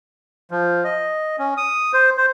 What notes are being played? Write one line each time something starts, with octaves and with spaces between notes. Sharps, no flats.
F3
D#5
C#4
D#6
C5
C5